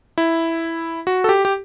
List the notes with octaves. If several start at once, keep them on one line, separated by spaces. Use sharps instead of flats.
E4
F#4
A4
G4
G4